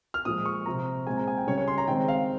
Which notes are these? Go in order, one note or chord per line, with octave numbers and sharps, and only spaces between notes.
F6
A#2 F3 G#3 D#6
C#6
C3 F3 C4 A#5
A#2 G#3 C4 G#5
A#5
G#5
G5
C#3 G3 C#4 C#5
C#5
C6
A#5
D#3 G#3 C4 G5
F5